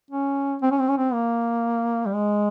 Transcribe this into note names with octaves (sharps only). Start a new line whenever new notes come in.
C#4
C4
C#4
C4
C#4
C4
A#3
G3
G#3